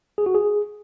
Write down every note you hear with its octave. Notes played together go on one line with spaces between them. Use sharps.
G#4
F#4
G#4